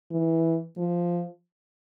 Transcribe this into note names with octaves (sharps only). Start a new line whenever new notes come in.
E3
F3